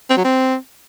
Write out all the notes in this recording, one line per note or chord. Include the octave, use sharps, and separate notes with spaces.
C4
F#3
C4